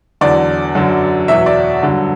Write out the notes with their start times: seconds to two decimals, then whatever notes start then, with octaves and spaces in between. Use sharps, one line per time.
0.21 E2 D3 F#3 D5
0.75 F#2 D3 F#3
1.28 E2 B2 F#3 E5
1.46 D5
1.82 G2 D3 F#3